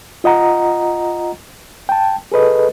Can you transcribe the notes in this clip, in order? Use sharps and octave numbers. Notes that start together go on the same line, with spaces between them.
F4 D#5 F#5 A#5
G5 A5
G#4 A4 B4 D#5